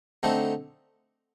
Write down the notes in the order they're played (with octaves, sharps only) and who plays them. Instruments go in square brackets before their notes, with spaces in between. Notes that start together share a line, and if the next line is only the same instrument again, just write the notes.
[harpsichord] D3 A3 C4 D#4